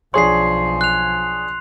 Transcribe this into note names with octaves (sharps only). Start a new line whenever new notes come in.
B1 F3 D4 G#4 C#5 C6 C7
F#6 F7